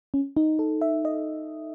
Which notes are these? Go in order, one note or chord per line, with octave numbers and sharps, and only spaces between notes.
C#4
D#4
A4
E5
D#5